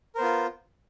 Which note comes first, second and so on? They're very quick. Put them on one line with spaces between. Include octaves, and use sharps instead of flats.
A#4 C5 B3 F4